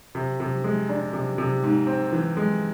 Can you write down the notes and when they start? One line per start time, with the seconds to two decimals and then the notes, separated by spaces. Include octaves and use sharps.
0.15 C3
0.40 C3
0.64 G#3
0.89 D4
1.13 C3
1.38 C3
1.63 G#2
1.87 C4
2.12 E3
2.37 G#3